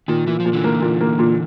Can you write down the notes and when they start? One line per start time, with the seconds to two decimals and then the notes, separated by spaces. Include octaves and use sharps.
0.08 A#2 D#3
0.27 A#2 E3
0.40 F3
0.45 A#2
0.53 D3 E3
0.64 A#3
0.82 A#2
1.01 A#3
1.19 A#2